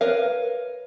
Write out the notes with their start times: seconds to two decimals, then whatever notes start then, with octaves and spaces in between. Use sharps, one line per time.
0.01 A#4 B4 C#5 F5